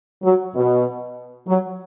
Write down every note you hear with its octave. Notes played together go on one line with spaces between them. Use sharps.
F#3
B2
F#3